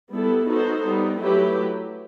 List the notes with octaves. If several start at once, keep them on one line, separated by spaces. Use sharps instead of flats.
G3 B3 E4 A4
B3 D#4 F#4 A4 C5
G3 B3 D#4
F#3 A3 E4 G4 B4